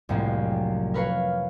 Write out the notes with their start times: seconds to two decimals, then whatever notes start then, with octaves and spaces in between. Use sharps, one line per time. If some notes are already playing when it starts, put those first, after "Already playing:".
0.09 C2 F2 A2 F#3 G#3 A#3
0.94 A#4 B4 C#5 F5